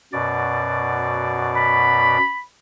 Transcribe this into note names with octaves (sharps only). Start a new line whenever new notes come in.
F#2 B2 D5
B5